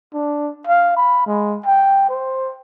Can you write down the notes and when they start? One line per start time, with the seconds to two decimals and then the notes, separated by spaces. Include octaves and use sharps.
0.14 D4
0.67 F5
0.96 B5
1.27 G#3
1.66 G5
2.09 C5